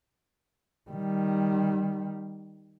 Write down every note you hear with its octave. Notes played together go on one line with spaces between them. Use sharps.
D#3 G3